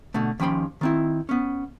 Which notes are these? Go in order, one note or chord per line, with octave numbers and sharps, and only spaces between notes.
B2 D3 A3
D#2 F3 C#4 G5 B5 C6
D#3 C4 E4
B3 C#4